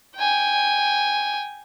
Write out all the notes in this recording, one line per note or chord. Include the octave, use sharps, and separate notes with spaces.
G5 G#5